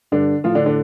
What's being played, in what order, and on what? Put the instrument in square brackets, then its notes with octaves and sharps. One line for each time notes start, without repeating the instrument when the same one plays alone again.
[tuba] G2 [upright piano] D3 D4
[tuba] A2 [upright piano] F3 F4
[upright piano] D3 D4
D3 D4